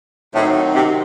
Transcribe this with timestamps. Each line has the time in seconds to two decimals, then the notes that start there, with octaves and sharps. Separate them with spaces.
0.33 A2 D#3 F#3 C4 D#4 F#4
0.75 C3